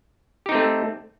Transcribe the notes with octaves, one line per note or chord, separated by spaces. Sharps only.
A3 C4 D#4 G4